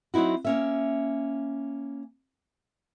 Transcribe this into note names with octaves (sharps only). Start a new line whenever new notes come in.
F#3 C4 D#4 E4 F#4
A#3 C#4 E5